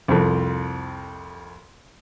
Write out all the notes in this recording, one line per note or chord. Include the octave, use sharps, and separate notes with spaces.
C2 F2